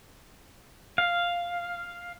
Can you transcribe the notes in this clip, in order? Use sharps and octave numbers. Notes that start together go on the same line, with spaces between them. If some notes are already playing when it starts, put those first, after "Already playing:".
F5